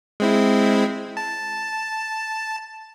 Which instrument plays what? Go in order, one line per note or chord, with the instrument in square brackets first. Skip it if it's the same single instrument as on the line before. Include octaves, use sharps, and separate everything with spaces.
[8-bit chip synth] G#3 C4 E4
A5